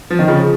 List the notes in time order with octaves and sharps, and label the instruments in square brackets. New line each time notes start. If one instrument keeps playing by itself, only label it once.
[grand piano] F3
D#3
C#3 F3